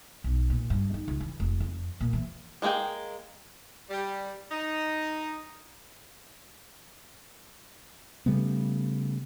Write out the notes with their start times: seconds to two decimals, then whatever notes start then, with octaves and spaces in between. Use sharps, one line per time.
0.24 B1
0.50 A#2
0.70 G2
0.94 D#4
1.08 C#2
1.20 E3
1.40 F1
1.60 F2
2.00 A#2
2.13 E3
2.62 G3 G#3 A#3 G#4 G5
3.90 G3
4.51 D#4
8.26 C#3 G3 A3 B3